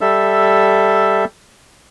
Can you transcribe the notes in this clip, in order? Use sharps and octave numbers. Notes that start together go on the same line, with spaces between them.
G3 A4 E5 E6